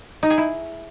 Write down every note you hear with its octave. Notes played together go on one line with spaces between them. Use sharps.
D#4
G#4
E4